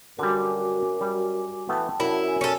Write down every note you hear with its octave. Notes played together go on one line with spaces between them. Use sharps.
F#2 D3 G3 F#4 G#5 D6
G3
E3 A3 B3 G5 A5
F#2 D4 E4 F#5
G#5
C#4 A4